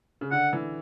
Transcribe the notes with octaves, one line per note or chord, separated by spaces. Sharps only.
C#3
D3 F#5
E3